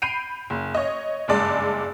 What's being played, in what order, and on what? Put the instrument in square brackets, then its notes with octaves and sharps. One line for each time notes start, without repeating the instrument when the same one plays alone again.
[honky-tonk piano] B5 G6 C7 D7 D#7 F7
F#1
C#5 D#5
F#1 G2 G#3 D5 A5